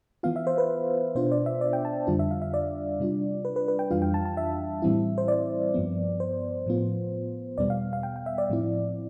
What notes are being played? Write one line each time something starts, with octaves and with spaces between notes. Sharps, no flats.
E3 B3 F4 F5
E5
C5
B4
B2 B3 D4 F4 C5
D5
E5
D5
G5
A5
F2 D3 G3 D4 F4
E5
F5
E5
D5
C3 G3 D4 F4
B4
B4
B4
G5
F2 E3 G3 D4 F4 F5
G5
A5
A5
E5
A2 E3 G3 C4 E4
C5
D5
G2 F3 B3
C5
A2 F3 B3 F4
E2 B2 G3 B3 D5
F5
F5
G5
G5
E5
D5
A2 F3 C4 E4